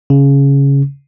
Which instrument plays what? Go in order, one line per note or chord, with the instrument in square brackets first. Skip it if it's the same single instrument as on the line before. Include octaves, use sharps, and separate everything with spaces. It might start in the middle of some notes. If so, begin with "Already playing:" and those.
[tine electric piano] C#3